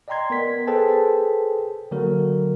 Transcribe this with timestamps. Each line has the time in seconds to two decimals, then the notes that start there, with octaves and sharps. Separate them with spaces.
0.08 D5 D#5 G5 A#5 C6 G#6
0.30 B3 A#4 B6
0.67 G#4 A4 B4 C5 G5 A5
1.91 D3 F#3 A#3 F#4 A#4